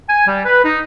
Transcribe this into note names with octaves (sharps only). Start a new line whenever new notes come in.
G#5
G3
B4
D#4